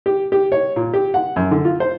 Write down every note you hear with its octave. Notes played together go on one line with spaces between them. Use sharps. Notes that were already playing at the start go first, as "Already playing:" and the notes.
G4
G4
C#5
A#2
G4
F#5
F#2
D3
F4
C5